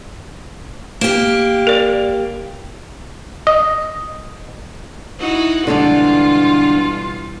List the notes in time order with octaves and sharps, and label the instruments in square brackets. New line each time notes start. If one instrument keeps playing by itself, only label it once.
[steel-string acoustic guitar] A#3 G4
[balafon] A#4 D5
[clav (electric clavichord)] D#5
[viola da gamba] D#4 E4 F#4
[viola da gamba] B2 E3 G3 [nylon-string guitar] D3 G#3 D4 [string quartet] F4